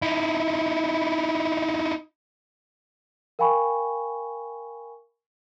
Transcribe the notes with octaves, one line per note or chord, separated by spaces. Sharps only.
D#4 E4
A#4 F5 G5 G#5 B5 C#6